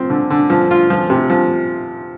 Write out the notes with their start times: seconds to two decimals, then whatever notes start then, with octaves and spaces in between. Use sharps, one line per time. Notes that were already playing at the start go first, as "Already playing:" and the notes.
Already playing: F3 C4
0.10 D3
0.30 D3
0.50 F3
0.71 F4
0.90 F3
1.10 C3
1.30 F3